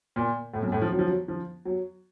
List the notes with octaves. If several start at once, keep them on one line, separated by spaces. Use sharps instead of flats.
A#2
A2
F#2
A2
F3
F#3
F3
F#3
F3
F#3